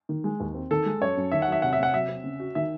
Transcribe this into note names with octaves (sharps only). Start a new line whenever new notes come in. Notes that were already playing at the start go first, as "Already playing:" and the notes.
D#3
G#3
D#2
C4
D#3 A4
G#3
F#2 C#5
F#2
D#3 E5
F#5
F#3 E5
C3 F#5
E5
C3 F#5
F#3 E5
C4
C#3
F#4
D#3 E5